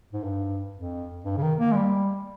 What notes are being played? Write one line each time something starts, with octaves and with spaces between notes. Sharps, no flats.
G#2
G2
F2
G2
C#3
D#3
A#3
G#3
G3